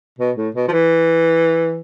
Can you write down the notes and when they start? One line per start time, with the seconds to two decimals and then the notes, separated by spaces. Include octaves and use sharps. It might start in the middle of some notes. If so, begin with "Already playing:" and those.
0.19 B2
0.37 A2
0.55 B2
0.68 F3
0.71 E3